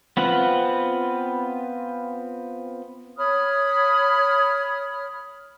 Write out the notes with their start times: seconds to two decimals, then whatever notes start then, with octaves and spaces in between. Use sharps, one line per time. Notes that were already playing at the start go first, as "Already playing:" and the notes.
0.17 B3 C4 F4 B4 F#5
3.17 C#5 B5 D#6 F6